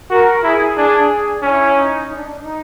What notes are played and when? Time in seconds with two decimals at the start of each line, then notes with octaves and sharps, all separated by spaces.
0.10 F#4 A#4
0.43 E4 G#4
0.77 D4
1.42 C#4 E4
1.75 D#4
2.08 D#4
2.16 D4
2.31 D4
2.41 D#4